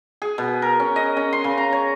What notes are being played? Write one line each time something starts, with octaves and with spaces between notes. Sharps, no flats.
G#4
B2
A#4
C#4
D#5
C#4
C6
C#3
A#5
C#5